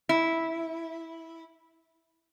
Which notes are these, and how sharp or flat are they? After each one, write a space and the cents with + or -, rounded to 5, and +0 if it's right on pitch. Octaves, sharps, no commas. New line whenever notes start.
E4 -10